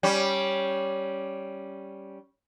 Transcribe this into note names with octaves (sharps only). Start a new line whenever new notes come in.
G3 C#4